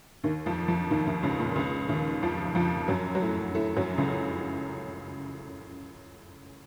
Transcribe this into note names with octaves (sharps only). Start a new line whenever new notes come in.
D#2 D#3
F2 F3
F2 F3
D#2 D#3
D#2 D#3
C#2 C#3
A#2
C#2 C#3
D#2 D#3
F2 F3
F2 F3
F#2 F#3
F#3
A2 A3
A2 A3
F#2 F#3
C#2 C#3